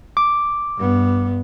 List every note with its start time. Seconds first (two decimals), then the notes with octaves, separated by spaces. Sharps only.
0.17 D6
0.77 G2 B3